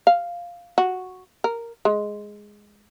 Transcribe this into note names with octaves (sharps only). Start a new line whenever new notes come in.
F5
F#4
A#4
G#3